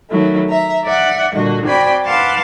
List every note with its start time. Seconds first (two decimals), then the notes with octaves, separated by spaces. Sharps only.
0.10 D#3 F#3 A3 E4
0.49 E5 A#5
0.84 D5 E5 F#5
1.34 A#2 D3 G3 F#4 D#5
1.64 C4 F#4 D5 G5 G#5 B5
2.03 B4 F5 F#5 A5 C6 D6